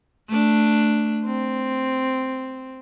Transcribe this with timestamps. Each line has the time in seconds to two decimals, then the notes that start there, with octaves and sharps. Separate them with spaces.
0.29 A3 D4
1.25 C4